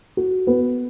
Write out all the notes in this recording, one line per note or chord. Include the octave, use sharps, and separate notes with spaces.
F#4
B3